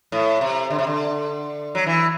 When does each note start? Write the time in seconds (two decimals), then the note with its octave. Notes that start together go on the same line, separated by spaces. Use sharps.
0.12 A2
0.41 C3
0.70 D3
0.79 C3
0.87 D3
1.75 F#3
1.87 E3